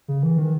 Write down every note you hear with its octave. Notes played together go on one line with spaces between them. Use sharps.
C#3
E3
D#3